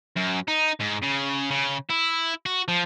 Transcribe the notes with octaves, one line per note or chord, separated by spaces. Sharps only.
F#2
D#4
G#2
C#3
C#3
E4
F#4
F3